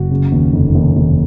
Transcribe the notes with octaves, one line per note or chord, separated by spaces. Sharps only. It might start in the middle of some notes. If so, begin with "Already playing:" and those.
Already playing: F#1 F#4
C#3
D#2
F1
D#2
D#2